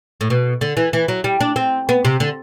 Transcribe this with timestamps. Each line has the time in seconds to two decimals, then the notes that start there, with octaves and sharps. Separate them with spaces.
0.21 A2
0.30 B2
0.61 D3
0.77 E3
0.93 E3
1.08 F#3
1.24 G3
1.41 D4
1.56 C4
1.89 B3
2.05 C3
2.20 D3